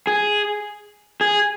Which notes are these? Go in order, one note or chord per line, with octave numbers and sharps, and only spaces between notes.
G#4
G#4